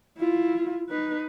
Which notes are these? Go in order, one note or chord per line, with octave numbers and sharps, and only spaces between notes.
E4 F4
D#4 B4